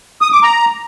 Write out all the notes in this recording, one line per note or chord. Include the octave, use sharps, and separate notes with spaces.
D#6
D6
A#5